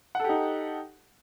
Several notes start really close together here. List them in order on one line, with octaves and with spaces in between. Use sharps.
F#5 A4 G4 D#4